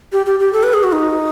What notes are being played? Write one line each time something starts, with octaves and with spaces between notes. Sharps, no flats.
G4
G4
G4
A4
B4
G#4
F#4
D#4